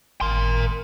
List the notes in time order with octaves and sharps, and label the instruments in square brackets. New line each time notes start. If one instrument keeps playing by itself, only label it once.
[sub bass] G#1 [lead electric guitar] A#4 C6